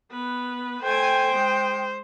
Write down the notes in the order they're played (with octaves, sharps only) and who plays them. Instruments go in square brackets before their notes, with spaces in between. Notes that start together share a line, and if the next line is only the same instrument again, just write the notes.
[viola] B3 B4
[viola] A3 G#5 [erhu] C5 [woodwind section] G5
[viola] G#3